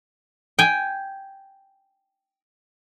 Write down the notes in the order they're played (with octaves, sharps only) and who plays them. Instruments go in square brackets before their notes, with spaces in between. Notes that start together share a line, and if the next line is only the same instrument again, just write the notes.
[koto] G5 G#5